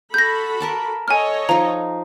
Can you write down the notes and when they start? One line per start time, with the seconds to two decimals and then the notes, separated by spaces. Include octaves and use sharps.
0.14 F#4 A4 B5 G6 A#6
0.60 A#4 A5 D6
1.08 A4 C#5 D#5 G#5 F6
1.49 F3 D#4 A#5